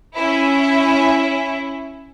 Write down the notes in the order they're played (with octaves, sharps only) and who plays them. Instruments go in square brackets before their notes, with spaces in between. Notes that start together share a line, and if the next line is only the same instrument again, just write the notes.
[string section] C#4 E4